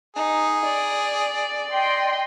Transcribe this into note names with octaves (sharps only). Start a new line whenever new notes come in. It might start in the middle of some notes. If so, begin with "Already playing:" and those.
D#4 G#4
D5
D#5 G5 C6